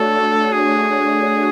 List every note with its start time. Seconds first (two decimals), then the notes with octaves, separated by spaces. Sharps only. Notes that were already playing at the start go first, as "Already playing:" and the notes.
Already playing: A3 D4 F#4 A4 C#5
0.52 G#4